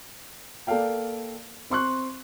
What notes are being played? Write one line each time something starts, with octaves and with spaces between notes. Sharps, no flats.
A#3 A4 A#4 D5 F5 G5
C4 C6 C#6 F#6